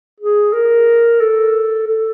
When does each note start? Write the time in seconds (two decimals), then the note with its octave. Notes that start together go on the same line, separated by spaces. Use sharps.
0.20 G#4
0.53 A#4
1.21 A4
1.87 A4